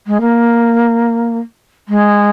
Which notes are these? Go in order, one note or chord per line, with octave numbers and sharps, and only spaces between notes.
G#3
A#3
G#3